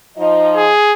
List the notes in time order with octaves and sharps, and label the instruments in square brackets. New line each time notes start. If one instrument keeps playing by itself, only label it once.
[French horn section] F3 D#4 D#5
[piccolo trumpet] G#4